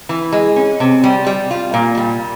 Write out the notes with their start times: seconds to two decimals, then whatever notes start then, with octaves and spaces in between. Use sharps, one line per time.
0.09 E3
0.32 G#3
0.56 C#4
0.80 C3
1.04 G3
1.27 G3
1.51 F4
1.74 A#2
1.97 G3